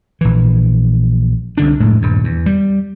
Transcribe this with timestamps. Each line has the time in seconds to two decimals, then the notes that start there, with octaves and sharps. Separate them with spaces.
0.21 A#1 E3
1.58 C2 D3 D4
1.80 F1 A2 G#3
2.02 D#1 G2
2.24 E2
2.46 G3